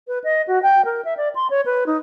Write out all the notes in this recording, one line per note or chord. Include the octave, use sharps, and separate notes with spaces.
B4
D#5
F#4
G5
A#4
E5
D5
C6
C#5
B4
D#4